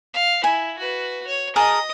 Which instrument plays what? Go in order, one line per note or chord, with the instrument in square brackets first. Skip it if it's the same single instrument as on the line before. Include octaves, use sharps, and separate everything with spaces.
[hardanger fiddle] F5
[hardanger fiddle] E4 [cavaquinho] G#5
[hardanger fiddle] F#4 B4
C#5
[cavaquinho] G#4 A#4 A5 [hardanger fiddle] D#5 D#6